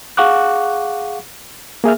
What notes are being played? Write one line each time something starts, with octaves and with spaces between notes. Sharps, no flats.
G#4 F5 F#5 C#6 D6 F#6
A#3 G#4 E5 F6